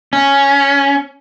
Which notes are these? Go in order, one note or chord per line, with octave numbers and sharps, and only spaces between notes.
C#4